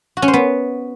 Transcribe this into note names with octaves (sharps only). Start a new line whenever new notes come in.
F#4
C#4
C5
B3